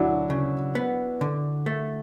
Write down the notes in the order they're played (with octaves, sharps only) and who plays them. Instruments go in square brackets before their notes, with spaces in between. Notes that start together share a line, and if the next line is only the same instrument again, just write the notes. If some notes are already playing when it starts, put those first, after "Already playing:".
Already playing: [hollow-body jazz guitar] D2 F#3 [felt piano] D4 E4 F#4
[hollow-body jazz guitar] C#3
B3
D3
A3